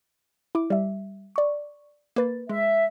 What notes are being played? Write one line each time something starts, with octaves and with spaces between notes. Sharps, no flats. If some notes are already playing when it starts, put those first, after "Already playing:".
E4 D6
G3 E5
D5 C#6
A#3 B4 A6
G#3 E5